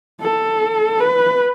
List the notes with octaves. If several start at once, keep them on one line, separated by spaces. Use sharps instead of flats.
A4
B4